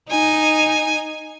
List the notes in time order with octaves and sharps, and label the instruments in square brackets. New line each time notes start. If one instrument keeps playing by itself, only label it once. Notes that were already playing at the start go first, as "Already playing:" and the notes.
[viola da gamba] D#4 [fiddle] G#5